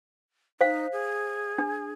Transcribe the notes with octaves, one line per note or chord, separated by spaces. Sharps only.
D#4 C5 F5
G#4
D4